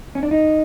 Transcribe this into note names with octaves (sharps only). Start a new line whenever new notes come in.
C#4
D4
D#4